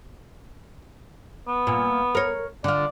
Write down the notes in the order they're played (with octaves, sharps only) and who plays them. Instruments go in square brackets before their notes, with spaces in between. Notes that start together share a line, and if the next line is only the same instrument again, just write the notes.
[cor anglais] B3
[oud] A#2
A#4 C#5
[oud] D3 F4 [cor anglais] D5